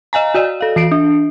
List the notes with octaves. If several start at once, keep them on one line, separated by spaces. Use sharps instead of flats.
D#5 F5 G#5 A#5
F#4 D5 D#5
A4 F5
E3 C7 D7
D4